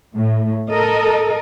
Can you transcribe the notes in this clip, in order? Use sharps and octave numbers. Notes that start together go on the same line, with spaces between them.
A2
A4 A#4 D#5